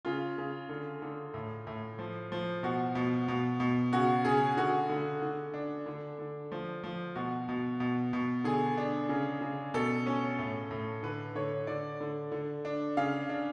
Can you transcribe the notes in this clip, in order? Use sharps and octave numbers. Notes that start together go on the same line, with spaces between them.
C#3 F4
C#3
D3
D3
A2
A2
F3
F3
B2 F#4
B2
B2
B2
C#3 F#4
C#3 G#4
D3 F#4
D3
D3
D4
D3
D3
F3
F3
B2 F#4
B2
B2
B2
D3 G#4
D4
C#3
C#3
B2 A4
C#4
A2
A2
D3 B4
D3 C#5
D3 D5
D3
D3
D4
C#3 F5
D4